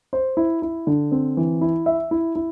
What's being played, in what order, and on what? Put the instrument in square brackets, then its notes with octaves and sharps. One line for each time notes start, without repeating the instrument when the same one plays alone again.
[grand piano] C5
E4
E4
D3
C4
E3
E4
E5
E4
E4